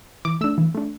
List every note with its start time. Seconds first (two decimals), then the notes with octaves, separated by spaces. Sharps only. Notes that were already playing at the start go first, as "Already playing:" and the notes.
0.25 E3 D6
0.41 A3 D4 E6
0.58 E3
0.75 A3 D4